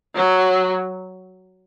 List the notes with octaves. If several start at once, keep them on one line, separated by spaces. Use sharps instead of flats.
F#3